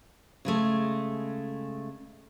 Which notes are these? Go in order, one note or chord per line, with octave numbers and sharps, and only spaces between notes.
C#3 G#3 A3